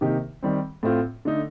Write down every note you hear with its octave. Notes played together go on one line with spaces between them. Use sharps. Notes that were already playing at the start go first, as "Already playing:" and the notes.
C3 D#3 A#3 D#4 G4
D#3 G3 C4
A2 A3 C4 F4
D3 A3 D#4